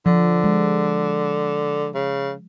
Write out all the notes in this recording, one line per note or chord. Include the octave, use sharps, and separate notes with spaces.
D3 F3
G#3
C#3